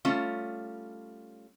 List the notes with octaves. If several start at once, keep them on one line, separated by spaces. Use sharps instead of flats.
G3 A3 C#4 F4